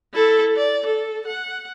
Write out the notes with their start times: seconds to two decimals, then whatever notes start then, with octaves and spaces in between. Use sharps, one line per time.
0.14 E4 A4
0.56 D5
0.86 A4
1.26 F#5